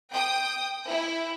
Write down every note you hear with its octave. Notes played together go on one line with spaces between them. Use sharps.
G5 D#6
E4